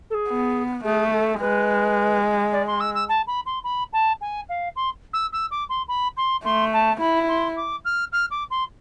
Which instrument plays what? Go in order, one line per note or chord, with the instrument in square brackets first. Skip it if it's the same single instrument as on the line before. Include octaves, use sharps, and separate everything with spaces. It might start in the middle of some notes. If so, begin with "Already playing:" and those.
[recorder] A4
G#4
[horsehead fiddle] B3
[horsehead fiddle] A3 [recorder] G#4
[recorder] A4
[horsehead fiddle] G#3 [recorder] B4
[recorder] D5
C6
E6
E6
A5
B5
C6
B5
A5
G#5
F5
C6
E6
E6
D6
C6
B5
C6
[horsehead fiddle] A3 [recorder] C6
[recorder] A5
[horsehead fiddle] E4 [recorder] B5
[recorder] C6
D6
F6
F6
D6
C6